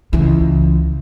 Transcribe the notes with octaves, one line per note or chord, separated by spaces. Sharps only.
C#2 E3